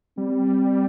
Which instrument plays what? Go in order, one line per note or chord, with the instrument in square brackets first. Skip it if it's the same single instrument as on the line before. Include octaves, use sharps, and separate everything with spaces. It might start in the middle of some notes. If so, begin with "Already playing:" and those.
[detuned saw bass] G3 [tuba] C4